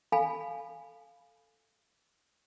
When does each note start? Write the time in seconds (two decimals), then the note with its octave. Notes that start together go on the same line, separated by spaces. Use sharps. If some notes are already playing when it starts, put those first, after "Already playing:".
0.12 A4 F5 G#5 B5